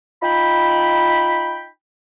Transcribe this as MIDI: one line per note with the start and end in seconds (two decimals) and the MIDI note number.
0.23 1.66 63
0.23 1.66 65
0.23 1.66 79
0.23 1.66 83